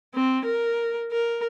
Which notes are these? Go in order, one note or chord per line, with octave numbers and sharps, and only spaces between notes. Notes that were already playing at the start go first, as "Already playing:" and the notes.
C4
A#4
A#4